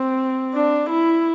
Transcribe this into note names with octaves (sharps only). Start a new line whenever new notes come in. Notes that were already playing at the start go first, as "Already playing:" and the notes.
Already playing: C4
D4
E4